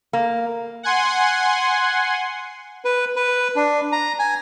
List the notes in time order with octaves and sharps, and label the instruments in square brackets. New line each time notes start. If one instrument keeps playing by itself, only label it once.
[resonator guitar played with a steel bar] A#3
[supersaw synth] F#5 G#5 C6
[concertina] B4
B4
D4
A#5
G#5